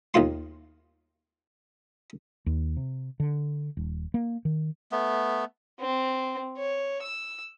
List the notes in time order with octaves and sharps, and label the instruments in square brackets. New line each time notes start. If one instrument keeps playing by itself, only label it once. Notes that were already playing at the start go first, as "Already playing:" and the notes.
[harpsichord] D#2 D#3 F4 C6
[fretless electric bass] D#2
C3
D3
D#1
A#3
D#3
[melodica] A3 B3
[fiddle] C4
C#5
E6